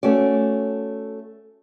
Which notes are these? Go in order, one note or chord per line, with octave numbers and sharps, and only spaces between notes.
A3 C#4 F#4 D5